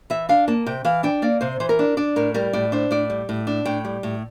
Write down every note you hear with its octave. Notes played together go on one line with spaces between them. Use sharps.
E3 E5
D4 F5
A#3 A5
C3 G5
E3 F5
D4 G5
A#3 D5
C3 C5
E3 C5
A#4
D4
D4 D5
A2 A#4
G3 A#4
A2 D5
D4 C5
A2 D5
G3
A2
D4
A2 G5
G3
A2